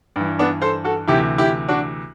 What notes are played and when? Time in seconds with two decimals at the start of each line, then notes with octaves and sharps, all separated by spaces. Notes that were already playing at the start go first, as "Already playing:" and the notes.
0.16 G2 E3
0.39 B3 D4
0.62 A4 C5
0.84 F#4 A4
1.08 D2 C3 E3 E4 G4
1.38 E4 G4
1.68 D4 F#4